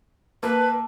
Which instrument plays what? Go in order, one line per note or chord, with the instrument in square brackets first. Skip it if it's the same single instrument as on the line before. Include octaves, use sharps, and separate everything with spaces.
[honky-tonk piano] A#3 [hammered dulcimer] A4 [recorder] B4